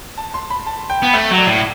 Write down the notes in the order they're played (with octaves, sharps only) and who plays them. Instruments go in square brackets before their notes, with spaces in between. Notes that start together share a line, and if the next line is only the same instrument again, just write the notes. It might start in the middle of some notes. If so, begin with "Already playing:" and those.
[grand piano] A5
C6
B5
A5
G5
[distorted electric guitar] B3
[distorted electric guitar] A3 [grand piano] E5
[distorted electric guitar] F#3
[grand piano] D5
[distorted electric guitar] A2